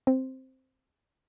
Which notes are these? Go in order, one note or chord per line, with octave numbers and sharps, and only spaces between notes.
C4